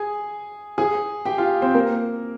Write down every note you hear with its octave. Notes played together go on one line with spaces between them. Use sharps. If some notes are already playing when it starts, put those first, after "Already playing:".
Already playing: G#4 G#5
G#4 G#5
G4 G5
F4 F5
C4 C5
A#3 A#4